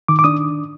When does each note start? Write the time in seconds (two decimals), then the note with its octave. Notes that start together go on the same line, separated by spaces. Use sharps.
0.08 D#3 D6
0.19 D6
0.24 D4 D#6